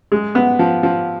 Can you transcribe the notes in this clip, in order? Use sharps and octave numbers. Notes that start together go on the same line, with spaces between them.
G#3
B3
F3
F3